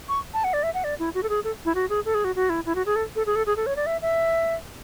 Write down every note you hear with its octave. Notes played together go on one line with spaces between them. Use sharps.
C#6
A5
F#5
D5
E5
F#5
D5
E4
F#4
A4
G#4
A4
E4
F#4
G#4
A4
G#4
F#4
F#4
E4
E4
F#4
G#4
A4
A4
G#4
A4
G#4
A4
C#5
D5
E5
E5